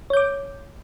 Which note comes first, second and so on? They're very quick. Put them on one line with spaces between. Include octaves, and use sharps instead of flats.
C#5 G6 D6